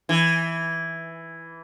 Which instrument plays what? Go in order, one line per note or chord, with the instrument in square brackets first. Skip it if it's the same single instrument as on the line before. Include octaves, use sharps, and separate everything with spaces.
[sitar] E3